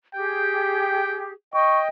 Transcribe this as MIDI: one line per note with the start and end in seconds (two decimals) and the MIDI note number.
0.15 1.32 67
0.15 1.32 68
0.15 1.23 79
1.54 1.88 75
1.54 1.88 79
1.54 1.80 85